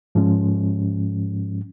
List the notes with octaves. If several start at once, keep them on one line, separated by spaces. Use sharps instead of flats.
G#2 F3 G#3 C#4